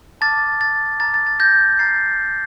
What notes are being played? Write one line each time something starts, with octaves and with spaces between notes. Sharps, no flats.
A5 D6 F6 A6
A6
A#5 D6 F6 A6
A6
A6
G6 A#6
A#5 F6 A6 C7